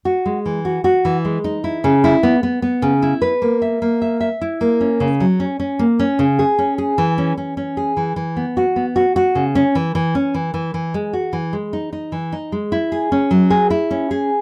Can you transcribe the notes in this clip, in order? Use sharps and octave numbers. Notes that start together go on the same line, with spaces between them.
F#4
G#3
E3
F#4
F#4
E3
G#3
D#4
E4
C#3
E4
B3
B3
B3
C#3
E4
B4
A#3
E5
A#3
E5
E5
E4
A#3
C#4
C#3
F#3
C#4
C#4
A#3
C#4
C#3
G#4
C#4
G#4
E3
C#4
C#4
C#4
G#4
E3
E3
B3
F#4
B3
F#4
F#4
C#3
C#4
E3
E3
C#4
E3
E3
E3
G#3
F#4
E3
G#3
D#4
D#4
E3
D#4
G#3
E4
G#4
C#4
F#3
G#4
E4
C#4
G#4